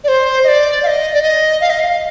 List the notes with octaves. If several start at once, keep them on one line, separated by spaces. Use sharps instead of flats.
D5
C5
D#5
D5
F5
D#5
D5
D#5
F5
D#5
F5